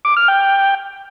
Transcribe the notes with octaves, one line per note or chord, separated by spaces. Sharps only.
D6
F6
G5